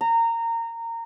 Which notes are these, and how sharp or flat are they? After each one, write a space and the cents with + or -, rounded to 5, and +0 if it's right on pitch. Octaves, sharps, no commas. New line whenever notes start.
A#5 -20